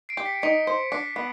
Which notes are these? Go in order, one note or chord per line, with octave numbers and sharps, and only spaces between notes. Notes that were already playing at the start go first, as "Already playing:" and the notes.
C7 D7
G4
B6 C#7
D#4 B6 C#7
C5
D4
B3